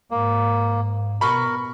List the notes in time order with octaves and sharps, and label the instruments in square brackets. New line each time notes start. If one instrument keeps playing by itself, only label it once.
[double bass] G#2 [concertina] A#3
[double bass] B2 [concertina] A#4 [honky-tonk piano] B5 C#6